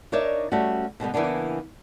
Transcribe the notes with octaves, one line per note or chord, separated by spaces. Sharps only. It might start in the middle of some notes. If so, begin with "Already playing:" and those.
D4 D#4 A#4 C#5 D5 E5
G3 A3 C#4 F#4
B2 D3 G3 B3
C#3 E3 G3 A#3 B3 D4